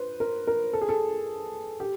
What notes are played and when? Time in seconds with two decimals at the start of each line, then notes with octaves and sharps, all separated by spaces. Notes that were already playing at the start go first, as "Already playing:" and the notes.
Already playing: B4 C5
0.20 A#4
0.47 A#4
0.73 A4
0.81 G#4
0.89 A4
1.80 G4